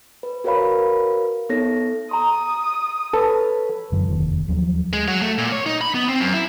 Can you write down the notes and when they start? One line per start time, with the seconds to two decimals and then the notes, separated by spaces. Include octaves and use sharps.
0.23 B4
0.44 F#4 A#4 B4 C#5 F5 B5
1.49 B3 D#4 A4 C#5 A#6
2.11 A#5 C6 D#6
3.13 A4 B4 C#5
3.92 F#2 D3 E3
4.08 F1 D#2 D#3
4.48 D#2 F3 F#3
4.93 G#3
5.08 F#3
5.22 A3
5.38 A#2
5.52 C#5
5.66 D#4
5.81 B5
5.95 B3
6.09 C4
6.20 F#2
6.34 E4